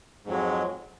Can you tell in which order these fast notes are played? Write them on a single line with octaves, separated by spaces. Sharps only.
G#2 F2 F#3 G#3